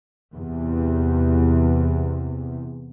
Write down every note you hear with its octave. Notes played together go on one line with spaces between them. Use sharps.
E2 C3